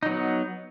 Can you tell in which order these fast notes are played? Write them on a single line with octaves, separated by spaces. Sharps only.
D#4 F#3 B3